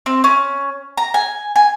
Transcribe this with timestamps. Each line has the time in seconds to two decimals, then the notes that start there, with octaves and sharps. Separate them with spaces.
0.06 C4
0.24 C#4
0.97 A#5
1.14 G#5
1.56 G#5